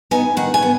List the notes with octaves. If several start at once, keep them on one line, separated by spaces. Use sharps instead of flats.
B3 D#4 G#5
D#3 F#5
G#5
B3